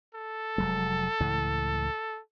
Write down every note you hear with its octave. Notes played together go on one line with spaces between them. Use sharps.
A4
F1 F#3 G#3
C#2 A2 E3